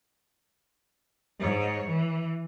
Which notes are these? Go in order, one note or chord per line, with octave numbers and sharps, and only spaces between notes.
G#2 C#5
E3